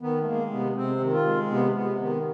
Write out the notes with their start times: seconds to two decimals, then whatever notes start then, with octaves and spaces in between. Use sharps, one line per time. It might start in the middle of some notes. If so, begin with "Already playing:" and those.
0.01 D#3 B3
0.21 A3
0.26 G#3 A#3
0.51 C3 B3
0.76 C3 C4
1.01 D#3
1.13 F4
1.25 G#3
1.50 C3 B3
1.75 C3 B3
2.00 D#3 B3